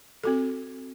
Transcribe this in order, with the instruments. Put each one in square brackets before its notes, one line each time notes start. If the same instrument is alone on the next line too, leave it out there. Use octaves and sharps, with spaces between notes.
[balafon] C4 F#4 A4